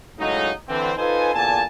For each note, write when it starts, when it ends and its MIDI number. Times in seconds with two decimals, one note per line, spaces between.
0.19 0.51 45
0.19 0.51 49
0.19 0.51 54
0.19 0.51 56
0.19 0.51 63
0.68 0.92 50
0.68 0.92 52
0.68 0.92 60
0.97 1.31 63
0.97 1.31 65
0.97 1.31 69
0.97 1.31 71
0.97 1.31 72
0.97 1.31 80
1.34 1.63 40
1.34 1.63 46
1.34 1.63 50
1.34 1.63 80
1.34 1.63 81